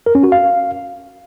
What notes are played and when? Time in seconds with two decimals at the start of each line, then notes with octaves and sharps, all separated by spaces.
0.06 A#4
0.15 C#4
0.24 F#4
0.32 F5